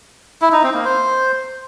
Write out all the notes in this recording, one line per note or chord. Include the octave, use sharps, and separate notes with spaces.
E4
D#4
C4
A#3
C5